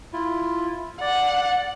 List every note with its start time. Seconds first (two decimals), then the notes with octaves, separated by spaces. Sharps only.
0.13 E4 F4
1.01 D5 F#5